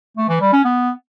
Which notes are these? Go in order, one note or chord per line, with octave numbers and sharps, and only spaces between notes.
A3
E3
G3
C#4
B3